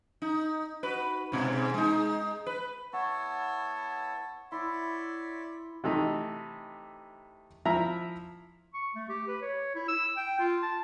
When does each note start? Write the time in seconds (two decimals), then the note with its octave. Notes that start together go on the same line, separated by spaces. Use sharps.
0.22 D#4
0.83 F#4 B4
1.32 G#2 B2
1.74 G#3 D#4
2.46 B4
2.93 B3 E4 C#5 F#5 A5 C#6
4.52 E4 C#5 D5 E5 C6
5.84 C3 E3 A3 D#4
7.65 F3 E4 E5 A#5
8.74 C#6
8.95 A3
9.09 G4
9.28 B4
9.42 C#5
9.75 E4
9.88 E6
10.17 G5
10.39 F4
10.63 A5